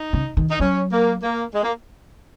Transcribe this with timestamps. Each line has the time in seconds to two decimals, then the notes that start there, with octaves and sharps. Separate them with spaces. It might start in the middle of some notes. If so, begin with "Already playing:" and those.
Already playing: D#4
0.13 C#3
0.37 D#3
0.49 D#4
0.60 F#3 C#4
0.91 A#3
1.22 A#3
1.53 G#3
1.62 A#3